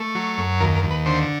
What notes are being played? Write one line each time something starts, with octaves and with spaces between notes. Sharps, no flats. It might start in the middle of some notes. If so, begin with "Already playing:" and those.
Already playing: A3
F#3
F#2
D#2 A#4
A#4
D#2
B4
D3 C5